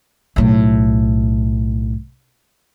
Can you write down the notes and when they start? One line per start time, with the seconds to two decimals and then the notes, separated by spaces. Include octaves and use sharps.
0.36 B1 A2